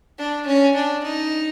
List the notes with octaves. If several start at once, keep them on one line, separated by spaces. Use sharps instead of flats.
D4
C#4
D4
D#4